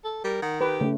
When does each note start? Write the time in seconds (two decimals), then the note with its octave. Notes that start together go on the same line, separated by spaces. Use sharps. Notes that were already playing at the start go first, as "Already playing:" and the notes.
0.04 A4
0.24 G3 A#4
0.42 D#3 F#5
0.61 G4 B4
0.81 C#3 A3